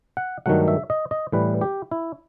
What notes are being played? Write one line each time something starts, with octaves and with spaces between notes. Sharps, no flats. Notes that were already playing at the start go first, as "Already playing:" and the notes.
F#5
G2 D#3 F#3 A3 F#5
E5
D#5
D#5
A2 E3 G3 B4
G4
E4